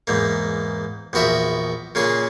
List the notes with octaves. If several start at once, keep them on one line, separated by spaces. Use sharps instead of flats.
E2 G#2 A#3
A#1 E2 F#4 A#4 E5
A#2 C#3 A#3 G#4